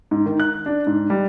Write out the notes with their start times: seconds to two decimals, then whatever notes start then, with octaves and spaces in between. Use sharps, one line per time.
0.11 G#2
0.26 D#3
0.40 F#6
0.66 D4
0.87 G#2
1.10 G3